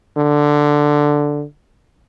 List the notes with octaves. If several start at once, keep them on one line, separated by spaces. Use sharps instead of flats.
D3